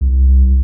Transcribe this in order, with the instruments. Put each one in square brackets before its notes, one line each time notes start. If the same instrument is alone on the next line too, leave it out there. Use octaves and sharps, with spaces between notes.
[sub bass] C2